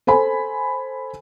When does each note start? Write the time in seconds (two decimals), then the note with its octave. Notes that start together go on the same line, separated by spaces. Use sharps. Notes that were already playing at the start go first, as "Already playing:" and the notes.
0.07 A4 C5 G#5 B5